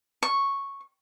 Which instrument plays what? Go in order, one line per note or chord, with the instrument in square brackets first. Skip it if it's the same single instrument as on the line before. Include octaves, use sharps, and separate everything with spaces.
[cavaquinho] C#6